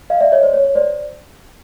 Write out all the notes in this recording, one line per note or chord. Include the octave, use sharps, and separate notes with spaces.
D#5 F5
D5 E5
C#5 D#5
C5 D5
C#5
C#5
C5 D5